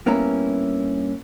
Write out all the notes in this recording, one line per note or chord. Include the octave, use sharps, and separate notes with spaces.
G2 A#3 B3 C#4 E4 A#5